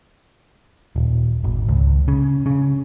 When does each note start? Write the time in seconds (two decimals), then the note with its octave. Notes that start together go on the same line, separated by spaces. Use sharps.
0.96 D#1
1.44 G#1
1.68 C#2
2.08 C#3
2.46 C#3